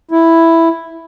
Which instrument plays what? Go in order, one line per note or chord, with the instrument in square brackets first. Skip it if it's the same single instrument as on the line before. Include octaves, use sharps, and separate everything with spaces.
[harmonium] E4